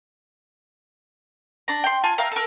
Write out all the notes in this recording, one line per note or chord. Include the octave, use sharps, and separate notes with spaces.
D4 A#5
G5 C6
F4 G#5 A5
E5 F5 G5 A#5
A4 A#4